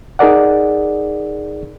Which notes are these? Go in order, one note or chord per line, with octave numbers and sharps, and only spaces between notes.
D#4 G#4 A#4 D5 F#5